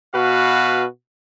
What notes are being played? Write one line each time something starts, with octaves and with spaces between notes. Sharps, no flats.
B2 F#4 B4 F5